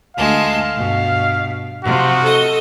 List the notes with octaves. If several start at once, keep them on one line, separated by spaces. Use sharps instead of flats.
D2 G#3 F5 A5
G2 B2
C3 F3 F#4
A4 D#5